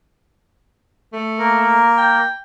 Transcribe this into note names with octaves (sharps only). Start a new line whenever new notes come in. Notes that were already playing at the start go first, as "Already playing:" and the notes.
A3
A#3 A#4
G5